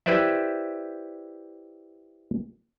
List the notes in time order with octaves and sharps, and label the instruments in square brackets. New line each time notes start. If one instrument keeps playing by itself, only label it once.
[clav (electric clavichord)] E4 G4 B4 C5 D5 E5